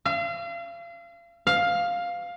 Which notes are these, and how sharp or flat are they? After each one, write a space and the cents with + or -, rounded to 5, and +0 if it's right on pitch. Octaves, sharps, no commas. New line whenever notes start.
F5 -35
F5 +10